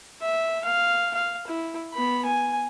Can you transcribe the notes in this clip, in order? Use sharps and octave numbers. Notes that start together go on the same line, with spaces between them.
E5
F5
F5
E4
B3 B5
G#5